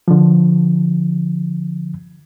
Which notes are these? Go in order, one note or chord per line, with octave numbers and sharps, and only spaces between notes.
D3 F3